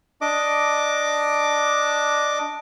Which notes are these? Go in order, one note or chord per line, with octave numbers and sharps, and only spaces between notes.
D4 D#5 D6